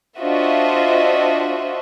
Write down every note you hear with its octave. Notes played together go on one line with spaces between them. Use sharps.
D4 F4 F#4 C5 D#5 E5